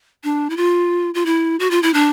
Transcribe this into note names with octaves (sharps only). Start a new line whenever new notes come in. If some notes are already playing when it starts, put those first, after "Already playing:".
D4
E4
F4
F4
E4
F#4
F4
E4
D4